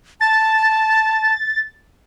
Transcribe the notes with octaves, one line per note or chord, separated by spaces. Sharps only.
A5 A6